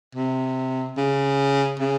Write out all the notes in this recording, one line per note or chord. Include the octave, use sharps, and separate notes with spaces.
C3
C#3
C#3